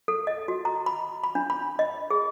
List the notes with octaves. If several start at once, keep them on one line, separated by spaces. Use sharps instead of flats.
A4
D#5
F#4
A#5
B5
B5
D4
B5
D#5
G#4